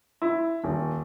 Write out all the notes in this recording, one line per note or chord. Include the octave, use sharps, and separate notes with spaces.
E4
D#1